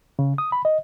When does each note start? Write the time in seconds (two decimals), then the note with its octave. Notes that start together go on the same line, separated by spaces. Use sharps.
0.19 C#3
0.38 D#6
0.52 B5
0.65 D#5